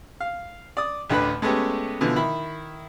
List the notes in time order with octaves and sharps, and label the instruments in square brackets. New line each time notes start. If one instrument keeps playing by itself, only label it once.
[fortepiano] F5
D5 D#6
A1 D2 D3 B4 B5
G#3 A3 B3 C#4 G4
B2 D3 E3 F3
D#3 E4 B5